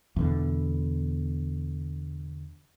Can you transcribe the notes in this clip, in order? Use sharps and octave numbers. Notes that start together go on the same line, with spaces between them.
E2 B2 D3